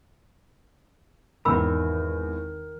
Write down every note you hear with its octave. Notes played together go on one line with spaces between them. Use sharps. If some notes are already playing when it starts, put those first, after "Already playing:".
G#1 E2 D#3 A#4 B5 E6